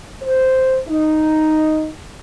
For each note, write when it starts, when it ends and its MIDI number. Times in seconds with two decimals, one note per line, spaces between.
0.23 0.79 72
0.88 1.89 63